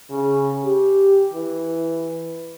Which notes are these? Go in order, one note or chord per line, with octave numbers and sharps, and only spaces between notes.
C#3
G4
E3